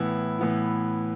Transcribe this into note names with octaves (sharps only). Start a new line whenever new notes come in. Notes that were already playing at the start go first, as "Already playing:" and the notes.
Already playing: A2 E3 B3 E4
A2 E3 B3 E4